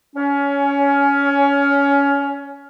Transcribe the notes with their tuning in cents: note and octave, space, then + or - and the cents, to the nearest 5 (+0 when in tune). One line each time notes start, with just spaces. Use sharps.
C#4 +20